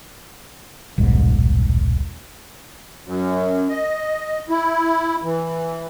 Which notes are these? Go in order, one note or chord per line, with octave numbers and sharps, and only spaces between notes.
D#1 B1 G#2
F#2
D#5
E4
E3